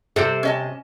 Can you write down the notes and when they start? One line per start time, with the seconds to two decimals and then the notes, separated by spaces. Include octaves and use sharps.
0.16 C3 G4 A4 C5
0.43 C#4 D#5 A5